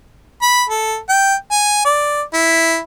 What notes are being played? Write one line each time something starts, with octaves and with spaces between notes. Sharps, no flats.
B5
A4
G5
G#5
D5
E4